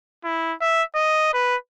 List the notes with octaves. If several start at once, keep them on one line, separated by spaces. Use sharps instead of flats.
E4
E5
D#5
B4